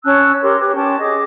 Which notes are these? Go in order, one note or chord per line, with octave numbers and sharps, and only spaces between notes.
C#4 A5 E6 F#6
G4 A#4 C#5 C6
G4 B4
C#4 G5 A5 C6
G#4 D#5 D6